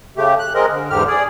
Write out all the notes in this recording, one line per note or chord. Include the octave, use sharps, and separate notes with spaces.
C#3 A3 G4
F#6
G#3 C4 A#4 D#5
D3
E2 G#2 D3 G4 F6
G#4 D5